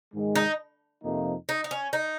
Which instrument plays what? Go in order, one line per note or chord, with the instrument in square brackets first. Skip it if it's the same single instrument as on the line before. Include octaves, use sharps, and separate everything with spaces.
[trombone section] G#2 D#3 G#3
[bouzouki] D#4
[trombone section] F2 C3 F3 A#3 D#4
[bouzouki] D#4
D#4
C#4
D#4